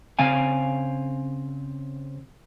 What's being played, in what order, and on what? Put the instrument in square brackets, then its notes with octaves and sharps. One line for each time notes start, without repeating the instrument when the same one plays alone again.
[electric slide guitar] C#3 C4 F5 G#5